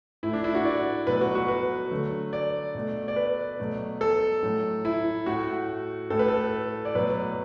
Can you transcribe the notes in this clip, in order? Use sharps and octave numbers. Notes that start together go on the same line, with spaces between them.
A2 A3 E4
D4
E4
F#4
D5
B2 F#3 A3 B4
F#4
F#4
B4
D3 F#3 A3
D5
B2 A3
D5
B4
B2 F#3 A3
A4
A2 F#3 A3
E4
A2 A3 F#4
A2 A3 A4
B4
A4
D5
B2 F#3 A3 B4